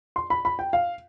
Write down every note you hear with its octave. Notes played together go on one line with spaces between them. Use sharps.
C6
B5
B5
G5
F5